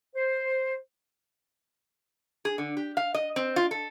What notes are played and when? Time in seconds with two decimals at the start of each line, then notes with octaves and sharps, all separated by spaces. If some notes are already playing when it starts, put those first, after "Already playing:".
0.15 C5
2.45 G#4
2.58 D3
2.77 G4
2.97 F5
3.14 D#5
3.36 C4
3.56 F4
3.71 A4